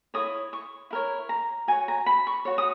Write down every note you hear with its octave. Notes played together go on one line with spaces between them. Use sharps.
E4 A#4 C#5 D#6
C#6
E4 A#4 C#5
A#5
F#4 C#5 G#5
A#5
B5
C#6
F#4 C#5
D#6